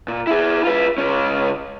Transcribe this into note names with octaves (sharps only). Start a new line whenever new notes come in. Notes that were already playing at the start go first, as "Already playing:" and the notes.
A#2
E4 G#4
F4 B4
C#2 C#4